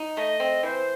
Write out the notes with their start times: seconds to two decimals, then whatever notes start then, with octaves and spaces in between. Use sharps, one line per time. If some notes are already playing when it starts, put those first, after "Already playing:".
Already playing: D#4
0.17 A3 D#5
0.40 C4
0.63 E3 C5